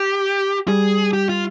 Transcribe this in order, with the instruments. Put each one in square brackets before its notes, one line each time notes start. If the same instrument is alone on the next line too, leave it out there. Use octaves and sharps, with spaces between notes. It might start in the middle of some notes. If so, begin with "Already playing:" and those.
Already playing: [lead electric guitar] G4
[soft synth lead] G3 [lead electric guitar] G#4
[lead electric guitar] G4
F4